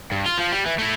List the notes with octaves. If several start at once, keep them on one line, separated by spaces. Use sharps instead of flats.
G2
F4
F3
G3
E3
A3 E4